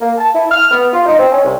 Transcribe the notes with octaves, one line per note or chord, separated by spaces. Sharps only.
A#3
A5
E4
F6
B3
F4
D#4
C4
C#4
C2